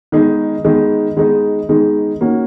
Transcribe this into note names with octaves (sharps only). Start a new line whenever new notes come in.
D#3 G#3 B3 D#4 G#4
D#3 G#3 B3 D#4 G#4
D#3 G#3 B3 D#4 G#4
D#3 G#3 B3 D#4 G#4
D#3 A#3 C#4 F#4